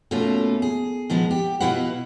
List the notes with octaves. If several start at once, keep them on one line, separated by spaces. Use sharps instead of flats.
B2 A3 A#3 C#4 F4
G#4
A#2 F3 G#3 B3
G4
B2 E4 F4 B4 F#5